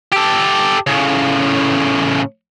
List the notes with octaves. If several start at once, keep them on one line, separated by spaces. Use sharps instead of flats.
G4 A4
A2 C#3